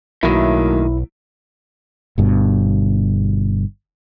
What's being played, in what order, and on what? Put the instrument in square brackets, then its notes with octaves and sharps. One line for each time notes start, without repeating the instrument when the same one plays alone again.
[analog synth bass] B1 [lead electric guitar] A2 D#3 [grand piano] F#3 A#3 E5 [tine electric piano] E4
[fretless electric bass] G1 G2 B2